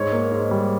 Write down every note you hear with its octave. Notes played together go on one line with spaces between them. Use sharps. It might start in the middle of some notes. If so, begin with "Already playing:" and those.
Already playing: G#2 C#5
A#3
G#2
G3